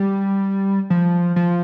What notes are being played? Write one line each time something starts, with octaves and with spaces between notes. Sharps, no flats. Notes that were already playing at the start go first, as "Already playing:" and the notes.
Already playing: G3
F3
F3